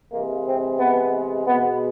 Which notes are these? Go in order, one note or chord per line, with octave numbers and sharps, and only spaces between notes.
C3 E3 G#3 A#3
C4
B3
B2 G#3 B3